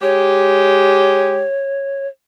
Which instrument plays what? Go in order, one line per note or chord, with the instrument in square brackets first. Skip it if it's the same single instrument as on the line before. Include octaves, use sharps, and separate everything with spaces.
[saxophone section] G#3 G4 [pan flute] C#5